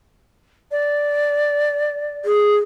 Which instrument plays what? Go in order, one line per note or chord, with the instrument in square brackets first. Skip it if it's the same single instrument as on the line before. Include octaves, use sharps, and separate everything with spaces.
[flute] D5
[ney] G#4